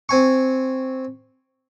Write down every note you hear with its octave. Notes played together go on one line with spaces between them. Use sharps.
C4 G#5 C#6